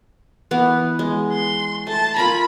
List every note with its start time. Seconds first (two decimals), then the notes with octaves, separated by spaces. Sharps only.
0.51 E3 B3
0.99 G#3
1.32 C6
1.87 A3 A5
2.16 F4 A#4 G#5 B5